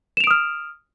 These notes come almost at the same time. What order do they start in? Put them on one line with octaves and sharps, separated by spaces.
E7 F7 D7 D#6 F6